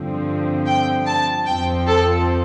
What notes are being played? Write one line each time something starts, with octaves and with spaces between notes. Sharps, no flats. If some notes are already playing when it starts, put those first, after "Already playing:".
Already playing: G2 D3 F3 C4
G5
A5
F2 F3 C4 G5
A4